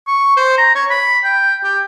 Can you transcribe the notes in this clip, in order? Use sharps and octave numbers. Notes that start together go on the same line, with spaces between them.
C#6
C5
A#5
C#5
B5
G5
G4